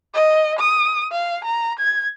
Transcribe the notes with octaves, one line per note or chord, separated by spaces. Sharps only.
D#5
D#6
F5
A#5
G#6